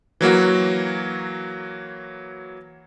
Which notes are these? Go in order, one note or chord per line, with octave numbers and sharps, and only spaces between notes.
E3 F#3 A#3 F#4